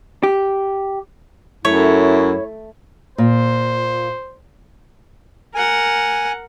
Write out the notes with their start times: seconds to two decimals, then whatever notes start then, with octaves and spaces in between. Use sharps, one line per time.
0.23 G4
1.65 F#2 A3 E4 C#5
3.18 A#2 C5
5.54 A#4 F#5 G#5